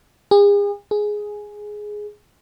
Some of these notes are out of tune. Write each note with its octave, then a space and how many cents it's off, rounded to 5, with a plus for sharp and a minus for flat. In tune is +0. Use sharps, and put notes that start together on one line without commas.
G#4 -40
G#4 +5